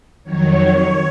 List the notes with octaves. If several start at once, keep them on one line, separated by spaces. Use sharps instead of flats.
F2 D#3 F#3 C#5